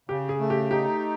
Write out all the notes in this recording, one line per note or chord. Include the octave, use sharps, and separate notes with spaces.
C#3 G4
G#4
A3
G4
D#4 G4